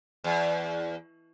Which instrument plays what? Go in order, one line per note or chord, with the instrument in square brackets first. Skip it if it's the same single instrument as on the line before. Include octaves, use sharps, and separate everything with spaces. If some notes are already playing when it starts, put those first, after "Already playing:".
[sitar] E2